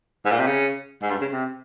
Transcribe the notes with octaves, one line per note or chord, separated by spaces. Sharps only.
G#2
A#2
C3
C#3
G#2
G2
C#3
C3